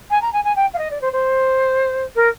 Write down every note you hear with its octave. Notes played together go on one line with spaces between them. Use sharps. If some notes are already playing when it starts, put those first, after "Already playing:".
G#5
A#5
G#5
G#5
G5
F5
D#5
D5
C5
C5
A#4